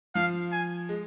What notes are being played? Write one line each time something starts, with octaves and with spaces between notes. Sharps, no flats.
F3 F5
G#5
G#3